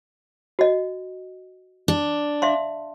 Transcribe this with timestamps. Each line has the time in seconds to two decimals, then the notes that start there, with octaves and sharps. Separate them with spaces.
0.59 F#4 D#5
1.88 D4
2.42 E5 F5 C6